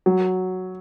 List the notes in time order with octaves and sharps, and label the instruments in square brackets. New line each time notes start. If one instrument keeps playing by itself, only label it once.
[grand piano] F#3